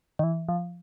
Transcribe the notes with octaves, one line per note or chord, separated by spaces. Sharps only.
D#3
E3
F3